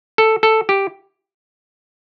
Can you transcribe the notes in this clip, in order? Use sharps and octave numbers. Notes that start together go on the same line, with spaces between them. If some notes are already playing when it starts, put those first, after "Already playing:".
A4
A4
G4